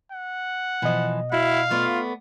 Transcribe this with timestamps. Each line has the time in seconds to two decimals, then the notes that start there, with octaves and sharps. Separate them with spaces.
0.12 F#5
0.82 B2 E3 F3 D#5
1.32 E4 F#4 F5
1.71 A3 B3 F4 D5